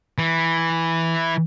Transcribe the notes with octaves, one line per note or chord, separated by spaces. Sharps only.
E3